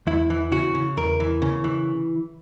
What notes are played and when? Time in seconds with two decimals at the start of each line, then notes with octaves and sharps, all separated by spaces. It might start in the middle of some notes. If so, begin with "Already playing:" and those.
0.07 E2 E4
0.30 E3
0.52 C#3 F#4
0.75 C#3
0.97 E2 A#4
1.20 E3
1.42 C#3
1.64 E3